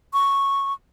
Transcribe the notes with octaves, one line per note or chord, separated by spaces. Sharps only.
C#6